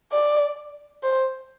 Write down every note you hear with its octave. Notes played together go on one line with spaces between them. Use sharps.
D5
C5